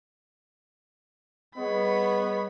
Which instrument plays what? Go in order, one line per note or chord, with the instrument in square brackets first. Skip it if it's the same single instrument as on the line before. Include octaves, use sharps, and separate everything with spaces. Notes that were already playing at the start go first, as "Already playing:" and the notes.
[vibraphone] G3 G#4 D#5 [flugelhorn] B3 [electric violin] C#5 B5